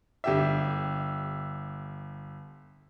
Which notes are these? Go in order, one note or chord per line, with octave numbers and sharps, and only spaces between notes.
G1 G4 E5